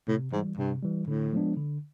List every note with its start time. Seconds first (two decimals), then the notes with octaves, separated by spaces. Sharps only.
0.08 A2 C3
0.32 G#2 E3 G3
0.57 G2 C3
0.83 E3 G3
1.08 A2 D3
1.33 F3 G#3 B3 D4
1.57 D3